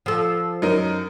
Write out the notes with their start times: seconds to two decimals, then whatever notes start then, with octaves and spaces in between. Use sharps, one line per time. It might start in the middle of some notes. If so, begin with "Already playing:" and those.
0.06 F3 A4
0.62 F#2 D#4 A#4